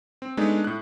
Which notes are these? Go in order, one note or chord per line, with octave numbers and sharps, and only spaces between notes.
C4
G#3 A3 B3 D4 D#4
A2 F#6